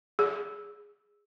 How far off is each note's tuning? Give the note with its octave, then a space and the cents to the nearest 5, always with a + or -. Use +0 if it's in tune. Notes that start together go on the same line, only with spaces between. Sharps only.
G#4 -5